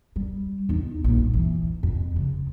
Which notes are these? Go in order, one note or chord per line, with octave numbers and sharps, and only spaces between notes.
G3
E2 D#4
A#1 G2
E2 E3
F2
C#3 F3